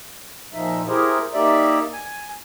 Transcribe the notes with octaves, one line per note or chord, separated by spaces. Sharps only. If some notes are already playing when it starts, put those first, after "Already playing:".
A#2 F3 D#4 E5
E4 G4 G#4 A#4 C5
A#3 D#4 G4 D5 E5
G#5